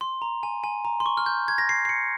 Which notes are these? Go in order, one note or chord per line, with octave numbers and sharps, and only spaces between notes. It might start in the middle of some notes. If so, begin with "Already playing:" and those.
C6
A#5
G#5
G#5
A#5
C6
C#6
F6
G6
G#6
A#6
C7
C7
C#7